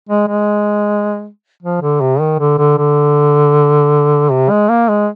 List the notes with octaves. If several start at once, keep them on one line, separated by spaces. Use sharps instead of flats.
G#3
G#3
F3
D3
C3
D#3
D3
D3
D3
C3
G#3
A#3
G#3